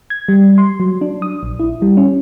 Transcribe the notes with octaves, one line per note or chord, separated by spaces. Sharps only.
G#6
G3
C6
F#3
D4
D#6
A#1
E4
G3
C#4